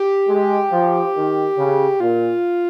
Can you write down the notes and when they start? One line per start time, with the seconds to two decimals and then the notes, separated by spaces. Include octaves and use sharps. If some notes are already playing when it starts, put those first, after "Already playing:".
Already playing: G4
0.28 G#3
0.71 F3
1.16 D#3
1.58 C#3
2.00 A#2 F4